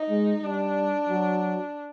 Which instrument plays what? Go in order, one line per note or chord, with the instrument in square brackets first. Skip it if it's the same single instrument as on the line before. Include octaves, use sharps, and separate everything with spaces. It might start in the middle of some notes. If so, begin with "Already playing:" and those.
Already playing: [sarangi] D#4
[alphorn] G#3
[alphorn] G3 [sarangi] D4
[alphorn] F#3